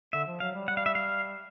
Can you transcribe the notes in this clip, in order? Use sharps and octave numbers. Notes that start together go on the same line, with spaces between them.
D3 E5
F3
F#3 F5
G3
G3 F#5
F5
E5
F5